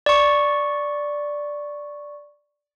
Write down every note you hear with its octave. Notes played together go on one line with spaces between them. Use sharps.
D5 C#6